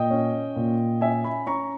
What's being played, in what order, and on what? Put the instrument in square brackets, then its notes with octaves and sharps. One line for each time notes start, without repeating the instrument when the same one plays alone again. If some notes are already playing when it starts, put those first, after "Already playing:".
Already playing: [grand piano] A#2 D#5 G5
C#4
A#2
C#4 E5 G#5
G#5 B5
C#4 A#5 C#6